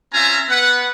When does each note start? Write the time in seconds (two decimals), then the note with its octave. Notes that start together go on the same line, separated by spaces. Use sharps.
0.13 C4 C#4 F4 E5 G#5 A#5
0.49 B3 B4 F#5